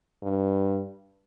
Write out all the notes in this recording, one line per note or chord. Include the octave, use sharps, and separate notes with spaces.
G2